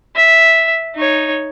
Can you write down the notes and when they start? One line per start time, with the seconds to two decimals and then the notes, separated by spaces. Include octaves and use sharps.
0.16 E5
0.95 D#4 C#5